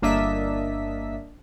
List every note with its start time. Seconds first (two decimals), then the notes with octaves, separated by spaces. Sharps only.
0.02 G1 A#3 D4 D#5 E5 B6